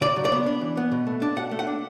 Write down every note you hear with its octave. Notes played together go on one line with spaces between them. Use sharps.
C#3 D5
F#3
D5
B3
D4
E3
B3
B2
A3
D4
B2 F#5
A3
F#5
D4